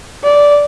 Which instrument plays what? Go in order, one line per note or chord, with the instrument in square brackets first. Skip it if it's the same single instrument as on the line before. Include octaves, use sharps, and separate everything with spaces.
[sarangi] D5